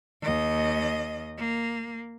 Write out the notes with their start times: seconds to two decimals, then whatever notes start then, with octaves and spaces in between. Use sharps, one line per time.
0.22 D#2 D#5
1.38 A#3